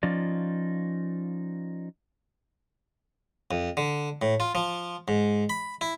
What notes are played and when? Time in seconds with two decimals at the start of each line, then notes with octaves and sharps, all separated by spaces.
0.03 F3 C#4 D#4 F4 D5
3.51 F2
3.77 D3
4.22 A2
4.40 F4
4.55 F3
5.08 G#2
5.50 B5
5.81 E4